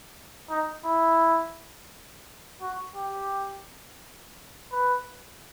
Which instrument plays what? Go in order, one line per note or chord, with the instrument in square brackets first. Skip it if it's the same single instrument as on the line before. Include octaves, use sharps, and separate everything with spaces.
[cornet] D#4
E4
F#4
G4
B4